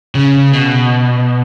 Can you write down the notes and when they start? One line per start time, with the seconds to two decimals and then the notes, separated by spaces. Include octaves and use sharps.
0.15 C#3
0.53 B2